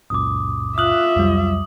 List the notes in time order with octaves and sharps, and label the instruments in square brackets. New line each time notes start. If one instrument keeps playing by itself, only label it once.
[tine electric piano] C#2 F#2 A#2 [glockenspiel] D6 D#6
[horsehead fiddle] F4 E5 [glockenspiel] D#6 F#7 [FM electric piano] F6 F#6
[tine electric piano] C2 F#3 [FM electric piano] F2 G3